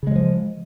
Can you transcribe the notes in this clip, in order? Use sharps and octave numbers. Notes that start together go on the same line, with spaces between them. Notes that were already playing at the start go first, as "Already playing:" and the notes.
C#3 F3 F#3 G#3